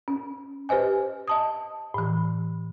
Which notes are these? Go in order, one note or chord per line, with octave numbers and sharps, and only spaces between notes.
C#4
G4 B4 C5 D#5 G#5
D#5 A5 D#6
A2 E3